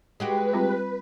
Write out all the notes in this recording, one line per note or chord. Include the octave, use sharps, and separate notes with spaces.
G#3 F#4 G4 B4
G3 C4 F4